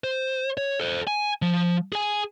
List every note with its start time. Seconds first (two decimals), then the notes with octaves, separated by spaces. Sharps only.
0.04 C5
0.57 C#5
0.80 A4 C5
1.07 G#5
1.42 F3
1.92 G#4 G#5